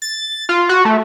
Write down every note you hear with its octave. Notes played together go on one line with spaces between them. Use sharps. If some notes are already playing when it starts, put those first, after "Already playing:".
A6
F4
F#4
A3